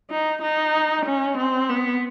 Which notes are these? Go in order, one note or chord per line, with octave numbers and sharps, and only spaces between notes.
D#4
D#4
C#4
C4
B3